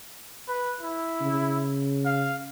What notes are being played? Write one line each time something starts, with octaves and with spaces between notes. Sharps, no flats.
B4
E4
C#3
F5